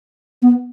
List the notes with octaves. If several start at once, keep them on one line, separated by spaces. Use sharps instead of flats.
B3